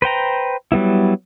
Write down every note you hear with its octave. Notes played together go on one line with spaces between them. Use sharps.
B4 C5 G5 A#5
F#3 G3 B3 E4